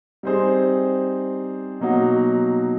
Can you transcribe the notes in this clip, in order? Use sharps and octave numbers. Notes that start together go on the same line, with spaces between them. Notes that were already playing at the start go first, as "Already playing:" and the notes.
G3 C4 D#4 G#4 C5
B2 F#3 A#3 D#4 F#4